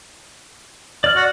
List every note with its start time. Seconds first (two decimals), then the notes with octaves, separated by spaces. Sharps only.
1.04 D5 F6
1.16 F#4